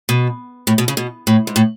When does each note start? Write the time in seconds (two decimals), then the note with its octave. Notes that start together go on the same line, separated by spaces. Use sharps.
0.09 B2
0.67 A2
0.78 B2
0.88 C#3
0.97 B2
1.27 A2
1.47 G#2
1.56 A2